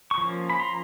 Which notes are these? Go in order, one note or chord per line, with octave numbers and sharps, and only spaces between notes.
C#6
F3 A#3 C#4
B5
A#5 C6